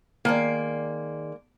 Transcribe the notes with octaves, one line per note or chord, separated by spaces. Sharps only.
D#3 G#3 A#3 D5